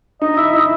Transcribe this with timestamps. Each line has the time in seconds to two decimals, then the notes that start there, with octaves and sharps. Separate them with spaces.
0.22 D#4 D#5
0.37 E4 E5
0.53 E4 D#5